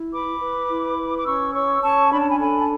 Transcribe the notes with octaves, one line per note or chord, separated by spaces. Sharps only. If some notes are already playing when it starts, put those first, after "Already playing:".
Already playing: E4
B4 B5 D6
B4
E4
B4
D6
C#4 C#6 E6
C#5 C#6 E6
C#4 A5 C#6
D4 B5
A5
G#5 B5
A4 G#5 B5
A5